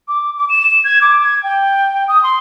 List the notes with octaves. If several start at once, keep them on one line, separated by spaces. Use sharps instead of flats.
D6
D6
E7
G#6
D6
G#6
G5
D#6
C6